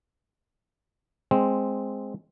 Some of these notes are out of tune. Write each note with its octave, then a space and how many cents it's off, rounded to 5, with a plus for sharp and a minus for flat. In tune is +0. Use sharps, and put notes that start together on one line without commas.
G#3 +0 C4 +0